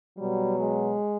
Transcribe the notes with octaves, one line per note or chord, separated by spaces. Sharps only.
B2 F#3 G3
G#3